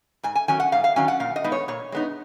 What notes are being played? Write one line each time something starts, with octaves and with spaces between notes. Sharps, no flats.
G#2 G#5
G#5
D#3 F#3 C#4 G#5
F#5
G#2 F5
F5
D#3 F#3 C#4 G#5
F#5
A#2 F5
D#5
G#3 B3 D#4
C#5
A#2 C#5
G#3 B3 D#4